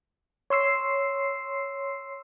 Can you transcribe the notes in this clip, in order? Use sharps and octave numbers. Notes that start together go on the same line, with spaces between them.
C#5 C6 E6 C7